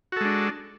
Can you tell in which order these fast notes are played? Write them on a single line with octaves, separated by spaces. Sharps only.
F#4 A4 G#3 D4